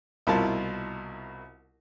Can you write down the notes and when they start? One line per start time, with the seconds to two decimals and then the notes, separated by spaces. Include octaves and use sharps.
0.27 C2 B2 E4 F4 A#4 A5